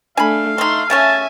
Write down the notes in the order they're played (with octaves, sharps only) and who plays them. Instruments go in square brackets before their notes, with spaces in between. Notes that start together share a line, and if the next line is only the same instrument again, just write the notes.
[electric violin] A3 D4 [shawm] F5 [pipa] G#5 B5
[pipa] A3 D#4 [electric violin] C6
[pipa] C#3 A3 C#4 [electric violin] E5 G#5 [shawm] A5